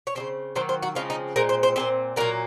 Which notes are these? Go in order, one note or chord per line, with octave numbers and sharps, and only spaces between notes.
C#5
C#3 F3 C4 C5
D#3 F#3 A#3 C5
C5
F#4
C#3 F3 G#3 C4 F4
D#4
A#2 G#3 C4 A#4
C5
C5
A#2 G#3 C4 C5
A#2 F#3 A#3 A#4